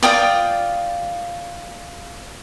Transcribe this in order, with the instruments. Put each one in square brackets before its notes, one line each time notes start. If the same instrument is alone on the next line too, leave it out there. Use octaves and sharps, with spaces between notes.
[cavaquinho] F4 D5 G5 D#6